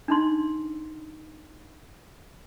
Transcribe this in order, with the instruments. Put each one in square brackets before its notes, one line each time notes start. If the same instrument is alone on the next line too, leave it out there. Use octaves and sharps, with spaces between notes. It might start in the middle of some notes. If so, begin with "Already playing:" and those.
[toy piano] D4 D#4 C6